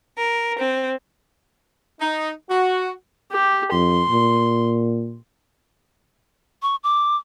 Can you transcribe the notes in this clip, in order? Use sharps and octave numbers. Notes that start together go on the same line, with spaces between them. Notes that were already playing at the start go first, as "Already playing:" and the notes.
A#4
C4
D#4
F#4
G4
F2 C6
A#2
C#6
D6